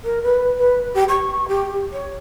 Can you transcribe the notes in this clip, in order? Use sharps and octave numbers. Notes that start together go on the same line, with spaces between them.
A#4
B4
B4
G4
C#6
G4
C#5